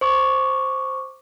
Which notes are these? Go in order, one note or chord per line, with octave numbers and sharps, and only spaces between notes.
C5 C#6 D6